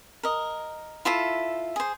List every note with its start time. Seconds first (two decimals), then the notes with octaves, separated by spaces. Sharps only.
0.23 A#4 D#5
1.05 E4 F4 A4 E5
1.76 G#4 C5